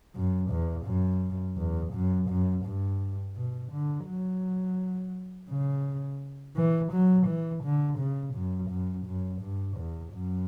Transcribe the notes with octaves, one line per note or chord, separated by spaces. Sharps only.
F#2
E2
F#2
E2
F#2
F#2
G2
B2
D3
F#3
C#3
E3
F#3
E3
D3
C#3
F#2
F#2
F#2
G2
E2
F#2